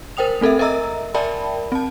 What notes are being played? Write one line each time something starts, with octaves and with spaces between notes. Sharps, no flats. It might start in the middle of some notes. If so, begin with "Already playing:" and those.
A#4 C5 G5 D#6 F7
A3 C4 A4 A#4 E5
A#4 D#5 E5 A#5 E6
A#4 D5 E5 G5 A5 B5
C4 A5